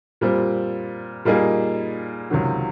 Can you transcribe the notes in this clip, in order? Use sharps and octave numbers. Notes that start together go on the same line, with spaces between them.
A#2 G3 C4
A#2 G3 A#3 D#4 G#4
C#2 C3 D#3 F#3